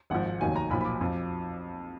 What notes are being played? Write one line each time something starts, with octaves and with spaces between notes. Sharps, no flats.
G#1 G#2 F3 F#5
F1 D#2 D#3 F#3 G#5
A#5
B1 A#2 F3 B5
B5
D6
F2 F3